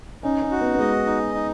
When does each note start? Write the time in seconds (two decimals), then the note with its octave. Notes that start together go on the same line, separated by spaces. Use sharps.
0.23 C#4 D#4
0.42 C#4
0.51 F#4
0.61 B3
0.75 B3
0.79 G#3 D#5
1.06 D#4
1.34 D#4